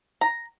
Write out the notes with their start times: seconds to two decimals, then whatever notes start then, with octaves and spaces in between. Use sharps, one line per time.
0.21 A#5